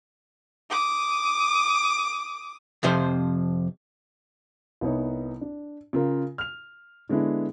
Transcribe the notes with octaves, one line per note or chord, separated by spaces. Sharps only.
D6 D#6
F2 C3 F3 C5
C2 B3 D#4 C#5
D4
C#3 F4 A#4
F6 F7
D3 G#3 B3 D4 E4